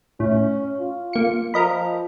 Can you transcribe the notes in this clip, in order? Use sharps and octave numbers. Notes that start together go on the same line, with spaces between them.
A2 C#4
F4
A#3 C#7
F3 A#4 D#5 B5